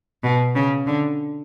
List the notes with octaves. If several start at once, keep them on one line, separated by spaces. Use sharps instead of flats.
B2
C#3
D3